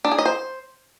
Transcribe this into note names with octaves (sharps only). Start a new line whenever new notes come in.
D4
G#4
D#5
C5